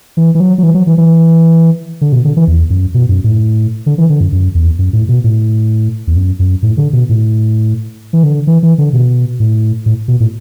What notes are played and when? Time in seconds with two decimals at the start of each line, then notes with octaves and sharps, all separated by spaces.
0.17 E3
0.35 E3
0.40 F#3
0.58 F#3
0.63 E3
0.74 F#3
0.87 E3
0.98 E3
2.01 D3
2.12 B2
2.25 D3
2.37 E3
2.47 E2
2.70 F#2
2.94 B2
3.09 F#2
3.24 A2
3.86 D3
3.98 E3
4.10 D3
4.21 F#2
4.32 F#2
4.55 E2
4.79 F#2
4.93 A2
5.08 B2
5.24 A2
6.07 E2
6.16 F#2
6.39 F#2
6.62 A2
6.77 D3
6.93 B2
7.09 A2
8.13 E3
8.23 D3
8.47 E3
8.63 E3
8.78 D3
8.93 B2
9.40 A2
9.86 A2
10.08 B2
10.20 A2